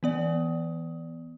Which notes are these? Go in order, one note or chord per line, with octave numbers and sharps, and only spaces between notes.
E3 B3 D5